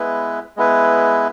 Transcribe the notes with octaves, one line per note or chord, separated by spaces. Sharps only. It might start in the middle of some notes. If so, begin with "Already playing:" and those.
Already playing: G#3 B3 E4 B4
G#3 B3 E4 B4